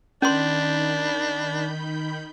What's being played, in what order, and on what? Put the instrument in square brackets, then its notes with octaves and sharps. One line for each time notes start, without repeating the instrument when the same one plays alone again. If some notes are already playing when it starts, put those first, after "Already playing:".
[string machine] D#3 B5 G6 [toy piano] C#4 C6 [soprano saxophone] D4